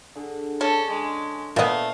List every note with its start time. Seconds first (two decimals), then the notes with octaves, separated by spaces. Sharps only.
0.15 D3 G#4 F#5
0.61 C#4 D4 A4
0.90 G#3
1.56 A#2 A3 B3 D#5 F5